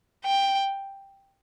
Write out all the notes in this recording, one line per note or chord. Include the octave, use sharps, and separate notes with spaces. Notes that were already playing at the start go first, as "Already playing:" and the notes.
G5